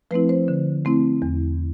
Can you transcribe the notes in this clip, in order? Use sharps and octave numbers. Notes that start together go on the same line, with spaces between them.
F3 A3 C4 E4 B4
C5
D3
A3 C4 E4
E2